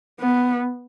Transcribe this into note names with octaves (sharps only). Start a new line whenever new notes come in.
B3